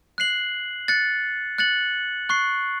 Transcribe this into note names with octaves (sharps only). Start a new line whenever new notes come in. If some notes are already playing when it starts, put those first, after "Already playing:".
F#6 C7 F#7
F#6 A6 C#7
F#6 A6 C#7 F#7
C#6 F#6 C7